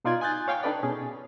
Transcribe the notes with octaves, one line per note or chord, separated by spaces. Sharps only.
B2 D#4 F4 D5 C6 G#6
G#5 D#6 F#6 G6 A6
C#5 F5 G5 G#5 C#6
D4 D#4 A4 B4 D5 G5
B2 C#4 G#4